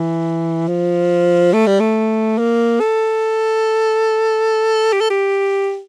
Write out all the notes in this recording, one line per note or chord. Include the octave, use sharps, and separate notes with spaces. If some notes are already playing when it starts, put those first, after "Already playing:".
Already playing: E3
F3
A3
G3
A3
A#3
A4
G4
A4
G4